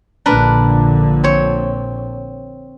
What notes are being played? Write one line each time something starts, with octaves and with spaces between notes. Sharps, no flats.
A#1 A#2 D3 D4 A#4 B4
C4 C#5